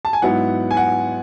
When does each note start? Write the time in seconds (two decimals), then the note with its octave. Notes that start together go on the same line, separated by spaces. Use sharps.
0.05 A5
0.13 G#5
0.22 G#2 F#3 B3 E4 F#5
0.71 G#5
0.77 F#5